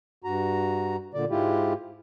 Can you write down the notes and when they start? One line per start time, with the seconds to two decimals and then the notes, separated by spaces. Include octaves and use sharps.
0.24 G2 F#4 A#5
1.14 A#2 D3 D5
1.30 G#2 G#3 E4 F4 G4